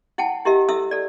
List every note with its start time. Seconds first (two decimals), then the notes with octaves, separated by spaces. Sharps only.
0.18 E4 F#5 G5 A5
0.45 E4 G4 A#4 D#5 E5
0.69 E4 A4 E5 D#6 E6
0.91 A4 D5